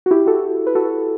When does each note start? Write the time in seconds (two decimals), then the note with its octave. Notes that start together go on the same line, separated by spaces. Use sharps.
0.06 F#4
0.11 E4 G4
0.26 F#4 A4
0.67 B4
0.75 F#4 A4